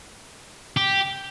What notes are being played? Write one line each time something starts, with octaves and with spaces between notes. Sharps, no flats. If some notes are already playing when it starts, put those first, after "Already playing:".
G4